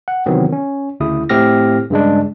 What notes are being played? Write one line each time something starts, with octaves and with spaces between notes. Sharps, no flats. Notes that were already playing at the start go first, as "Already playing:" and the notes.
F#5
C3 D#3 E3 F#3 B3 C4
C#4
D2 C#3 E4 D#6
A2 A3 C4 G4 F6 A#6
G2 C#3 G#3 D4